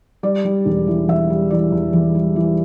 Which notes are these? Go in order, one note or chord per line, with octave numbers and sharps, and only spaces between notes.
G3 D5
G3
E1
E3
E3 E5
G3
E3 D5
E2
E2
G3
E3